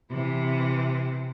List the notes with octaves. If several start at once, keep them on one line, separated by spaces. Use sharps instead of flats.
C3 E3